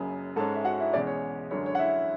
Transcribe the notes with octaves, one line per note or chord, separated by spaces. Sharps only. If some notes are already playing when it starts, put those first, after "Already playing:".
Already playing: F#1 F#2 C#3 G#4 G#5
G#2 G#3 C#4 A4 A5
E5
F#4 F#5
E4 E5
E2 B2 G#3 C#4 D5
C#5
F#2 D3 G#3 C#5
C#5
F#5
E4 E5